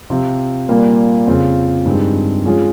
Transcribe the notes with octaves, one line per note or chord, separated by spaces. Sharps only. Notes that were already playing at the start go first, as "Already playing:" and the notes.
C3 F3 C4 F4
A#2 G3 A#3 F4
F2 C#3 F3 C4 F4
G2 D#3 G#3 C4 D#4
F3 G#3 C#4 F4 G#4